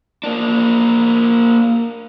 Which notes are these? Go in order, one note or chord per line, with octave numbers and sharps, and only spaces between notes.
A#3 D4